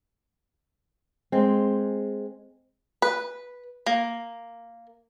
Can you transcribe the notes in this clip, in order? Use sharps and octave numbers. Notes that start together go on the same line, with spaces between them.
G#3 C4
B4
A#3